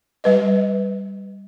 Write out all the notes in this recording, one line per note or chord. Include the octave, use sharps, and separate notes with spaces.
G3 B4 D#5